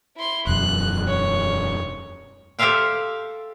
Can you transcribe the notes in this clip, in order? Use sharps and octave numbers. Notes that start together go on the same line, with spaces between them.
E4 C6
E1 F#2 F#6
C#5
G4 A4 C5 E5 F5 G5